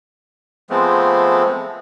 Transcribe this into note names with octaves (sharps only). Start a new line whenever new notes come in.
F3 G#3 A3 B3 C4